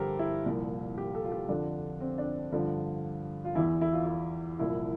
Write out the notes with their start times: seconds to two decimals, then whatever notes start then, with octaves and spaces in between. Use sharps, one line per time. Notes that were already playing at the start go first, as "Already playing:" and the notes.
Already playing: G2 D3 F3 G4 A4 A#4 C5
0.19 E4
0.46 C2 A#2 F3
0.98 G4
1.15 A4
1.24 F4
1.32 G4
1.48 F2 D3 F3 D4
2.00 C4
2.18 D4
2.52 G2 D3 F3
3.45 F4
3.55 E2 E3 E4
3.81 E4
3.93 F4
4.06 E4
4.59 C2 A#2 F3 E4